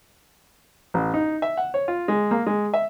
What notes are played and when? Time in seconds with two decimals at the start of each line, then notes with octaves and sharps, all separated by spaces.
0.94 A1
1.14 D#4
1.42 E5
1.57 F#5
1.74 C#5
1.88 F4
2.08 G#3
2.31 A#3
2.46 G#3
2.74 E5